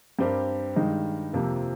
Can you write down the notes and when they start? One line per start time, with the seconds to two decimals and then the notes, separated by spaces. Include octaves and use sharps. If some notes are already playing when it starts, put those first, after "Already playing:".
0.19 G2 G3 C4 G4 A#4
0.76 G2 D#3 G#3 D#4
1.33 F2 C3 F3 A#3